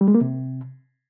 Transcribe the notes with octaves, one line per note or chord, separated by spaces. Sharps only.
G3
G#3
A#3
C3